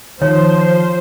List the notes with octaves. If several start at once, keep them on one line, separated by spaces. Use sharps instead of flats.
D#3 F3 C5 C#5